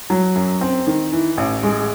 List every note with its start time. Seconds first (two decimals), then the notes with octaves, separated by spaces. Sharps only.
0.10 F#3
0.35 F#2
0.61 C4
0.87 D#3
1.12 E3
1.37 A1
1.63 G#3